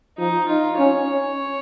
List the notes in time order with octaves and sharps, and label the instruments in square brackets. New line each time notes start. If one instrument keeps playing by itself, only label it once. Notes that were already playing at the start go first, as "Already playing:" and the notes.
[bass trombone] F3 [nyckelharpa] D#4
[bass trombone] D#4 [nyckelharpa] F4
[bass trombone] C#4 [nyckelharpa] C#5
[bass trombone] C#4